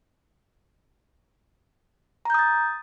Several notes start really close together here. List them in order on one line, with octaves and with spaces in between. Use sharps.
A#5 G6 D#6 A6